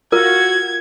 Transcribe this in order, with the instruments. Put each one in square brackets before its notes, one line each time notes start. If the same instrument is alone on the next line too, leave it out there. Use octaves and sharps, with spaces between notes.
[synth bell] F4 [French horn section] F#4 [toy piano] A#4 [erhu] G#6